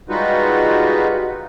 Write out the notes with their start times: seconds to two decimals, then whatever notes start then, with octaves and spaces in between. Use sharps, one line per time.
0.09 G3 G#3 D#4 F4 F#4 B4